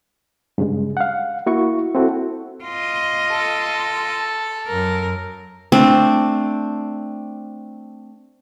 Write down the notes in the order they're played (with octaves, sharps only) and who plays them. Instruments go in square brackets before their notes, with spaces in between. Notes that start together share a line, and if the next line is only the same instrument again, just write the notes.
[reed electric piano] G2 C#3 G#3
F5 F#5
A#3 E4 F#4 C#6
C4 E4 F#4 A4
[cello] F4 D#5
[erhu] A4
[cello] F#2 A#4
[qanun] A3 C4 D4